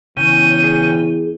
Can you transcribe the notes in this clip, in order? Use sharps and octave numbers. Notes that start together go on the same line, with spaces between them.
E2 C#3 C#4 G5 D#7
G#4